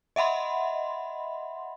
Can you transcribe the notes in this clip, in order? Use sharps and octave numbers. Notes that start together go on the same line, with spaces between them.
D#5 E5 F#5 B5 C6